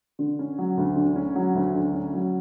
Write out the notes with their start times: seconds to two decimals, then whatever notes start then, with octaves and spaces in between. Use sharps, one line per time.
0.19 D3
0.39 C#4
0.59 F#3
0.77 D2
0.96 D3
1.16 C#4
1.36 F#3
1.55 D2
1.75 D3
1.93 C#4
2.13 F#3